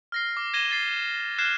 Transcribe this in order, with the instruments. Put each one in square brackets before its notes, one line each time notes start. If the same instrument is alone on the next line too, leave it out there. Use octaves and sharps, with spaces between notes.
[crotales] F6 A#6 C7
D6
G#6 A#6 D#7 E7 G7
A6 C7
F6 F#6 G#6 C7 E7